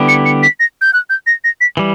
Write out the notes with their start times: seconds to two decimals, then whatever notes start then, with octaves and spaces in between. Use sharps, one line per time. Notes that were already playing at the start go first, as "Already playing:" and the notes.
Already playing: D3 G3 B3 E4 G4
0.08 C#7
0.25 C#7
0.43 B6
0.60 A#6
0.81 G6
0.93 F#6
1.10 G6
1.27 A#6
1.44 A#6
1.61 B6
1.77 E3 G3